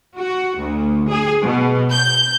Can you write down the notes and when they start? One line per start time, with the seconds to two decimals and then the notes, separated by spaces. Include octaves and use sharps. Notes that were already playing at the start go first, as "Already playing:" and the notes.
0.18 F#4
0.59 D2
1.10 G#4
1.43 B2
1.91 G6